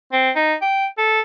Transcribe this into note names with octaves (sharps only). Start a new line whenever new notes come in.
C4
D#4
G5
A4